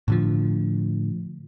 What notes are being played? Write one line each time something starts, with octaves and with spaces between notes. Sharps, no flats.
A2 D3 F3